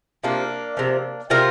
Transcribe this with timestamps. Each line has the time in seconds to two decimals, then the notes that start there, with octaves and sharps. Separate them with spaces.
0.24 C3 F3 A#3 D4
0.77 C3 F3
1.30 C3 G3 F4 A#4